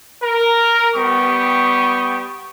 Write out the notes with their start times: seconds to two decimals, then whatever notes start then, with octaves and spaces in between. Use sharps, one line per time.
0.23 A#4
0.96 G3 B3 G4 C#6 D#6